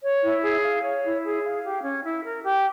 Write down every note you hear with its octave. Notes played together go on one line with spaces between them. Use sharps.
C#5
E4
G#4
F5
C#5
E4
G#4
F5
G4
C#4
E4
A#4
G4